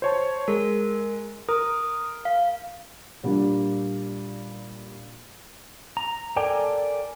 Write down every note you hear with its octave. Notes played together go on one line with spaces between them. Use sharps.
C5 C#5 A5
G#3 A#4
A#4 D#6
F5
A#2 G3 A#3 D4
A#5
A4 A#4 D5 G5 G#5